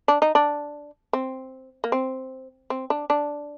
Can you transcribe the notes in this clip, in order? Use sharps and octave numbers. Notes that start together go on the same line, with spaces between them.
D4
D#4
D4
C4
A#3
C4
C4
D4
D4